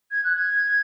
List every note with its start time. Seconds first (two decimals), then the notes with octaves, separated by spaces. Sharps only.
0.11 G#6
0.24 F#6
0.36 G#6